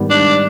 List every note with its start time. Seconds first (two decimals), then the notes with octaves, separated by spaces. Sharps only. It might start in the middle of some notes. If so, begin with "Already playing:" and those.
Already playing: G#2 D#3 G3 B3
0.10 D4